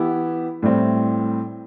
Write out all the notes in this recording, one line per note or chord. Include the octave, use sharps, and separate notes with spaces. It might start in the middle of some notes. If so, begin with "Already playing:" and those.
Already playing: E3 B3 E4 G4
A2 G3 C4 E4